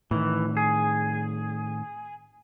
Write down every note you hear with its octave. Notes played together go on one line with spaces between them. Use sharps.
A2 D#3 E3
G#4